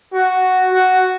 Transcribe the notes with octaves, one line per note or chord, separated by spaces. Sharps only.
F#4
F#4